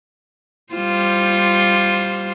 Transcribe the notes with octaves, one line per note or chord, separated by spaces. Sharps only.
G3 F4 C5